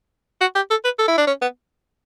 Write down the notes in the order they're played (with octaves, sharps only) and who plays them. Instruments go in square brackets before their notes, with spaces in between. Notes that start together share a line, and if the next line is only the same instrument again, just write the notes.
[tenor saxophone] F#4
G4
A4
B4
A4
E4
D4
C#4
B3